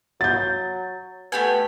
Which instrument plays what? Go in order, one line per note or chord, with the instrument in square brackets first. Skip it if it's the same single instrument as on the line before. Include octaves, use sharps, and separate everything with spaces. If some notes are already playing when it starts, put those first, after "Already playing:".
[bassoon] F#3 [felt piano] G6 A6
[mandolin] A3 G4 G#5 [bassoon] B3